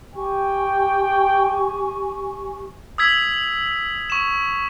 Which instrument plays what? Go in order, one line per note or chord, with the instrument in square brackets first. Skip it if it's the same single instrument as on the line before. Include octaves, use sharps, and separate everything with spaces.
[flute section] G4 G#5 C#6 [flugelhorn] G5
[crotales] D#6 E6 G#6 B6
C#6 E7